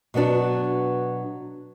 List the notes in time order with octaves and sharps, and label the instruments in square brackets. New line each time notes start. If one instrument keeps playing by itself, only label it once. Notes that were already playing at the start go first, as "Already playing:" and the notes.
[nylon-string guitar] B2 F#3 B3 D4 F#4